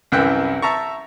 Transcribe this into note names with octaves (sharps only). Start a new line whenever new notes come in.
C2 F#2 E3 E4 G5 F#6
E5 A5 A#5 C#6